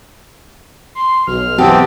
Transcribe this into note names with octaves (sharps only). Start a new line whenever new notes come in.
C6
B1 F6
E3 B3 C4 G4 A5